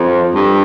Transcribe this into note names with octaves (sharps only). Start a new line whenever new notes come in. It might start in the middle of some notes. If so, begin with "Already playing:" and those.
Already playing: F2
G2